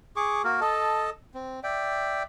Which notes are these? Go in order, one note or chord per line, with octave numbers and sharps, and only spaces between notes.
G#4 C#6 D6
A#3 F#4 A#4
A4 D#5 A5
C4
D5 E5 G5